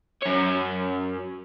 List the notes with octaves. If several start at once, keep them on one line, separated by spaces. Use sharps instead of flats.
F#2 C#5